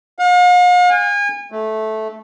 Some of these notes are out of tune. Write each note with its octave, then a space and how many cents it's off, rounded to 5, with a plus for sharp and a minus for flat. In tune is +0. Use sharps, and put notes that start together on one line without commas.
F5 +45
G#5 -35
A3 -10